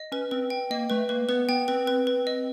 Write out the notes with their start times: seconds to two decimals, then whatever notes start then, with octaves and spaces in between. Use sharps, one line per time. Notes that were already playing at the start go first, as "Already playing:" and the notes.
Already playing: D#5
0.12 C#4 B4
0.31 C4 B4
0.50 G5
0.70 A#3 D#5
0.90 A3 B4
1.09 A#3 B4
1.29 B3 B4
1.49 B3 G5
1.68 C4 B4
1.87 B4
2.07 B4
2.27 D#5